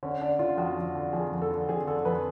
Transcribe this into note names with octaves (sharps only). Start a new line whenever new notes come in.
D3 C#4
D3 D4
D3 F4
F2 F#4
F2
D3
F2 G#4
F2
A4
D3
F2 G#4
D3 A4
F2 B4